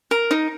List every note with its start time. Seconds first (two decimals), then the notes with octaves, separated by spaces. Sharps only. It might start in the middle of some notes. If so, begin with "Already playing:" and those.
0.11 A#4
0.31 D#4